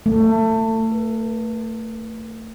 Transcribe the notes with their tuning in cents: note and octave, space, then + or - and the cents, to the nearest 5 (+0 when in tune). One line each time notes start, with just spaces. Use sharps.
A3 +25
B4 -35